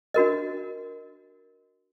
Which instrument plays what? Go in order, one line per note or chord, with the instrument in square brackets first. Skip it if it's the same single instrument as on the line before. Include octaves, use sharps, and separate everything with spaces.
[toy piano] D4 F#4 A#4 D#5